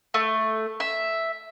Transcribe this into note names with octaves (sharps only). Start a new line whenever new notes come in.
A3
E5